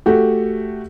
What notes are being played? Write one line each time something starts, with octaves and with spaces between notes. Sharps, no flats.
A3 F#4 G4